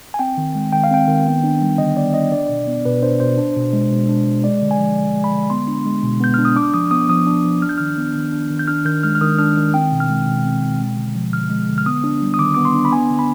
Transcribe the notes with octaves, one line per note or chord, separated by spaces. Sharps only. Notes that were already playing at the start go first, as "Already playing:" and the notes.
G#5
C4 G5
D#3
G#3
D#3 G5
F5
C4 G5
D#3
B3
D4
G3
D3 D#5
B3 D5
D4 D#5
D4 D5
B2
B3
B2 B4
D4 C5
B2 C5
D4
B2
G#3
B2
D4
B2
G#3 D5
D3
G#5
F3
D3
G#3
B5
D3
B3 C6
D4
G#3
B2
B3 G6
D4 F6
D#6
D4 D6
F3 D#6
B3 D#6
F3 D#6
D4
F3
D4 F6
G6
D#3 F6
B3
D#3
D4
D#3
G6
D4 F6
D#3 G6
G#3 F6
F6
D#3 D#6
D4 F6
D#3
C4 G5
B2
F6
G#3
B2
C4
B2
G#3
D3
F3
D3 F6
G#3
D3
F6
B3 D#6
D4
G3
D#6
D#3 D6
B3 D6
C6
D4
B5
B3 G#5
D3
B5